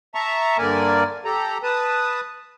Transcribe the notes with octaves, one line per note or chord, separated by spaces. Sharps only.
E5 A5 A#5 C#6
G2 D3 A#3 A#4 D5 G#5
G4 A4 A#5
B4 A5 D#6